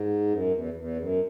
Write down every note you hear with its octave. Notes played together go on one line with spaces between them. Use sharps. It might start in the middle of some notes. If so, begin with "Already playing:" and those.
Already playing: G#2
F#2
E2
E2
F#2